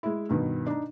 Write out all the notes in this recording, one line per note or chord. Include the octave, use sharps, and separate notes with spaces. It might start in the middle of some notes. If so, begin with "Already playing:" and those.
G#3 E4
G2 B2 D#3
D4 D#4